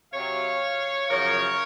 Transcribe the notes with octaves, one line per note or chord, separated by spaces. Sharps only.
C3 F#3 C#5 F5
F#2 C#3 F3 A#4 C#5